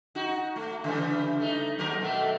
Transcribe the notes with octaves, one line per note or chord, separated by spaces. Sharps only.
D#4 F#4
A3
C#3 E3 G3
A3 D#4
D#2 F#3 A#4
B2 A3 E5